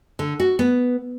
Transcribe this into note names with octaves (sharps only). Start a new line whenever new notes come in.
D3
F#4
B3